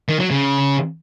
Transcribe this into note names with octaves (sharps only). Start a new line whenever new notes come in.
D#3
F#3
C#3